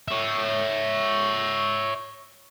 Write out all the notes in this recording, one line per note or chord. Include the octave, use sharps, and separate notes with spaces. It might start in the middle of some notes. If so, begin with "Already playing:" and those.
C#5 E5